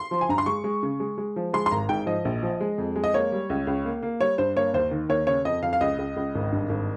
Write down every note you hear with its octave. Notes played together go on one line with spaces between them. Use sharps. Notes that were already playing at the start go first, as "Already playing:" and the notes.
Already playing: C6
F3
G#5
G2 A#5
C6
G#3 C#6
G#3
C#3
G#3
G#3
F3
G#3 C6
C6
G#1 A#5
G#2 G5
F3 D#5
A#1
F3
G#3
F2
G#3
D#5
A#3 C#5
G3
C#2
C#2
A#3
A#3
G3 C#5
G2 C5
A#3 C#5
D#2 C5
D#3
D#2 C#5
C#3 C#5
F2 D#5
F2 F5
F5
C#2 D#5
C#2
C#2
G#1
G2
G#1